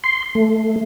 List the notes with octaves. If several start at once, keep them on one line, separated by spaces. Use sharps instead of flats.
C6
A3